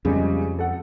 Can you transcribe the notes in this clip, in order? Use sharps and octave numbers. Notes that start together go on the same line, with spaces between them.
F2 C#3 G3 G#3
A4 F#5